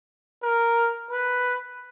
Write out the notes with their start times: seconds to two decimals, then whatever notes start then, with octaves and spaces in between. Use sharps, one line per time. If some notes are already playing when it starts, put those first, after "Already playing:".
0.43 A#4
1.11 B4